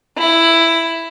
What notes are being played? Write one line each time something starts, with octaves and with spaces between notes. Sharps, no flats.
E4